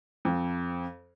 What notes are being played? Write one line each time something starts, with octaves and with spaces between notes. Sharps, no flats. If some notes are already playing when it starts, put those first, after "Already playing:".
F2